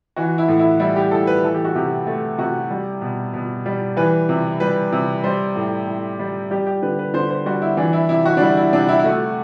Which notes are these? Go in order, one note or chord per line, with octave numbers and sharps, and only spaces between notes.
E3 F#4
E4
A2
E4
G3 E4
G4
A2 A4
B4
E3 A4
G4
F#4
C3 G4
A3
C3 F#4
G3
B2
B2
G3
E3 B4
C3
G3 B4
C3
G3 C5
A2
A2
G3
G3 G4
G4
D3 B4
B4
D3 C5
C5
G3 F#4
E4
E3 D4
E4
C3 E4
F#4
D4
G3 E4
E4
C3 D4
E4
E4
A3 F#4